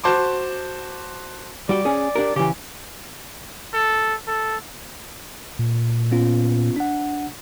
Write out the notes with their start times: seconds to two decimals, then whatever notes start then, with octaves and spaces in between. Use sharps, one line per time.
0.04 F#4 C5 A5 C6 D6
1.69 G3 F#4 G4 D5
1.85 C#4 G#4
2.16 D4 G4 A#4
2.36 C#3 E3 G4
3.74 A4
4.28 A4
5.59 A#2
6.11 B3 C#4 F4
6.76 D4 F#5